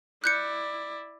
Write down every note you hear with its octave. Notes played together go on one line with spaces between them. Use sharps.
E4 D5 F#6 G6 C#7